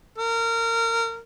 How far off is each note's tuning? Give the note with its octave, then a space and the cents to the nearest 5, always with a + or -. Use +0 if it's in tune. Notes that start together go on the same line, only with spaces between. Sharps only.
A#4 -25